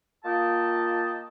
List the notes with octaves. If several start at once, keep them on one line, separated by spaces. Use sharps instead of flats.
A#3 F4 D#5 G5 A5